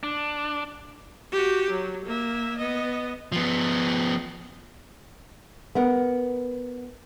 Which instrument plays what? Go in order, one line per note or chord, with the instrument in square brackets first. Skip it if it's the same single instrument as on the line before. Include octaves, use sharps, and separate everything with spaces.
[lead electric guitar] D4
[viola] F#4 G4
F#3
A#3 E5
B3 D#5
[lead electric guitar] F3 B3
[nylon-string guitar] B3 A#4 F#5